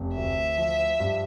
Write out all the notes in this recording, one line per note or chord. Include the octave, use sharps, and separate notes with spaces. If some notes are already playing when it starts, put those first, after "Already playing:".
Already playing: F1
D2 E5
F3
G2